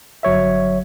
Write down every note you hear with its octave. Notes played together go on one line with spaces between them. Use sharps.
G1 F#3 C#5 E5